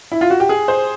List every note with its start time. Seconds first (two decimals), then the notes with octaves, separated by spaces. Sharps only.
0.12 E4
0.21 F4
0.30 F#4
0.40 G4
0.49 G#4
0.68 C5